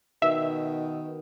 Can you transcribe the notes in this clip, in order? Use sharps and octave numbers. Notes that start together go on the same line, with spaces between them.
B2 D#3 E5